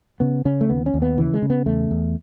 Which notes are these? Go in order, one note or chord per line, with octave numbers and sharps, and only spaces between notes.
C#3 B3
C#3 C#4
A3
D#2 B3
C#4
D#2
B3
C#3 E3
G#3
C#3
B3
E2 A3
E2